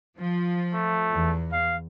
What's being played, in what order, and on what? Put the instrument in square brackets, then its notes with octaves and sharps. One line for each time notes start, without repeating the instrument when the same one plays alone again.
[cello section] F3
[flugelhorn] A3
[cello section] E2
[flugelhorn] F5